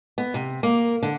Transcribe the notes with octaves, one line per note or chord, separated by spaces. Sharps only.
B3
C3
A#3
D3